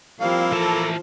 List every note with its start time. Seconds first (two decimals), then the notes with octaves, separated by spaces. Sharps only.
0.20 F3 G3 A#3 C4 E4 F5
0.52 E3 A4 A5 A#5